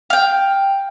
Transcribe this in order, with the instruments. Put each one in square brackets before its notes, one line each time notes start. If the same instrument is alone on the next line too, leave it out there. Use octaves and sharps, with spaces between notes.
[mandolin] F5 G5